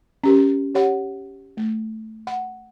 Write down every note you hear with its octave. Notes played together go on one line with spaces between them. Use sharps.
C#4 G4 A#4
G4 C#5 F#5
A3
F#5